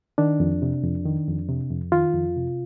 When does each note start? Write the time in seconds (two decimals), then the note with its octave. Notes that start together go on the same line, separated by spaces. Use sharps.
0.18 D#3 D4
0.40 F2
0.62 C3
0.84 F2
1.06 D#3
1.28 F2
1.48 C3
1.71 F2
1.92 D#3 F4
2.14 F2
2.36 C3